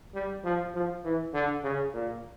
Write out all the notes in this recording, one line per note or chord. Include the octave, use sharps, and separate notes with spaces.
G3
F3
F3
E3
D3
C#3
A#2